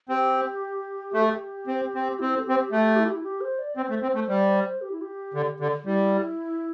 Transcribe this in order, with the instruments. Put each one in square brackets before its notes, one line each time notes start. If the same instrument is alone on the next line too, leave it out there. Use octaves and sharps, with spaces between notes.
[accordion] C4 [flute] G4
[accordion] A3 [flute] G4
[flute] A4
G4
[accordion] C4
C4
[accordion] C4 [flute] E4
[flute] A4
[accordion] C4 [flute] G4
[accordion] A3 [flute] G4
[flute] E4
G4
E4
G4
C5
D5
[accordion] C4 [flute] C5
[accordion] A3
C4
A3
G3
[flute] G4
E4
G4
[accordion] D3
D3
[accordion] G3 [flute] E4